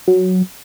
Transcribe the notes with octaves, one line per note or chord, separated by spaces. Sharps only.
F#3